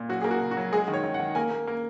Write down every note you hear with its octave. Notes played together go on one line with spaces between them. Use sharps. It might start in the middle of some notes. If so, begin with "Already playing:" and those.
Already playing: A#2
F#3 F#4
A#3 G#4
F#4
C#3
F#4
F#3
G#3 G#4
D#3
C#5
D#3
F#5
D#3
A#3 G#5
A#3
A#3